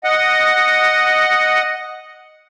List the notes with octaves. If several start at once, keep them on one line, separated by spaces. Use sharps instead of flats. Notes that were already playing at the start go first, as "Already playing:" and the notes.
D#5 F#5